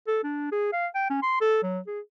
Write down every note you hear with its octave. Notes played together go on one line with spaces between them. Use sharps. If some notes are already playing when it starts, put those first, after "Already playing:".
A4
D4
G#4
F5
G5
C#4
C6
A4
F#3
G#4